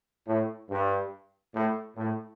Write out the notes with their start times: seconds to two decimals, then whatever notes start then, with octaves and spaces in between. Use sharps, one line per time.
0.27 A2
0.70 G2
1.55 A2
1.96 A2